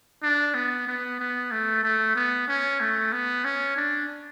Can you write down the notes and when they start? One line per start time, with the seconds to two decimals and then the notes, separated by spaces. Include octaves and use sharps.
0.23 D4
0.55 B3
0.87 B3
1.20 B3
1.52 A3
1.83 A3
2.15 B3
2.48 C#4
2.80 A3
3.13 B3
3.45 C#4
3.76 D4